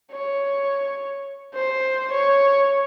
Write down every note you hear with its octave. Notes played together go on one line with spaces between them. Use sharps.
C#5
C5
C#5